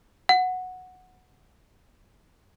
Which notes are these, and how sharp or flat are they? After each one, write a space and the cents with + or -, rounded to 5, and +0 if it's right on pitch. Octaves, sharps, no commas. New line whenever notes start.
F#5 -5